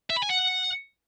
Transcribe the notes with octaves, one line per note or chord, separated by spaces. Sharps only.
E5
B5
G#5
F#5